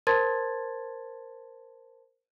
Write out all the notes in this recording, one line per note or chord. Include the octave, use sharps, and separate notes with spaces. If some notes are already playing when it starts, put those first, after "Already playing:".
A#4 C5 A5 C6 G#6 A6